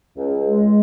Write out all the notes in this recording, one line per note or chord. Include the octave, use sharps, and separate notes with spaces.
C#2
G#3